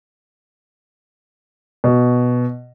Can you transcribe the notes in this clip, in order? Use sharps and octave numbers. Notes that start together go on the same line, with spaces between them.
B2